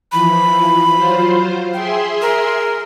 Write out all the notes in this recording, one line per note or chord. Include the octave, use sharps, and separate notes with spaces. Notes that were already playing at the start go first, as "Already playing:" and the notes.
E3 F3 B5
F#3 F4 C5
G#4 E5 G5 C6
A#4